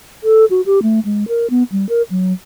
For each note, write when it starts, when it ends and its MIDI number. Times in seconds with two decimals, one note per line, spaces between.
0.24 0.45 69
0.51 0.61 66
0.66 0.82 67
0.83 1.00 57
1.05 1.28 56
1.28 1.50 70
1.50 1.63 59
1.72 1.88 55
1.89 2.02 70
2.10 2.33 54